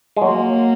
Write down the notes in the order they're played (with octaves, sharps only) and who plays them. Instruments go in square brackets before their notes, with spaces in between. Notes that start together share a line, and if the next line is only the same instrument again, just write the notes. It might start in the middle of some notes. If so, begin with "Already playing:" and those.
[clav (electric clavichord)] G#3
[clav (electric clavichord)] F#3 [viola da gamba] A#3